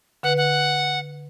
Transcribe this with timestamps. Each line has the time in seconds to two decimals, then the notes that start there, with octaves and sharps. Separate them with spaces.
0.23 D3 B4 F#5
0.37 F#5